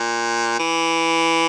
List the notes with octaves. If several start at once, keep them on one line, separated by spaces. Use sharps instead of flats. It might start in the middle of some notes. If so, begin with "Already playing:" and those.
Already playing: A#2
E3